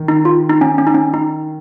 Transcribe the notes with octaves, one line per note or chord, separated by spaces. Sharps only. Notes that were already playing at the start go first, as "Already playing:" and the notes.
Already playing: D#3
D#4
F4
D#4
C#4
C#4
D#4
C#4
D#4